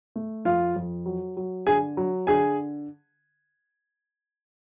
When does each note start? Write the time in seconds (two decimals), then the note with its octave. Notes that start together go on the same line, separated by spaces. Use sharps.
0.16 A3
0.45 F2 F4 F5
0.76 F2
1.06 F#3
1.37 F#3
1.67 D3 G#4 G#5
1.97 F#3
2.27 D3 G#4 G#5